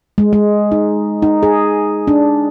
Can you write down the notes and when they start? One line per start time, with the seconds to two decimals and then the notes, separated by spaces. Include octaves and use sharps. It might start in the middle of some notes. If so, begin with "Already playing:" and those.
0.18 G#3
0.33 G#3
0.72 D#4
1.22 D#4
1.43 G#4
2.08 D4